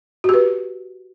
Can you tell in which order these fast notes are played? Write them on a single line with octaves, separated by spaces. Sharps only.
F#4 G4 B4